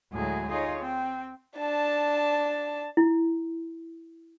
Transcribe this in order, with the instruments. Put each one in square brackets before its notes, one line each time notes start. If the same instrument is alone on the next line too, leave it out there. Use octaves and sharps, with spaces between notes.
[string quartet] D2 A2 F#3 G#3 A3 G#4
D#4 F4 G#4 C#5 D#5
C4 G5
[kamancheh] D4 A5
[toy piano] E4